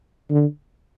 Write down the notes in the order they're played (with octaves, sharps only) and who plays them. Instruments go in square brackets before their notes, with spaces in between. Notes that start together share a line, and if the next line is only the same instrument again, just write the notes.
[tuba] D3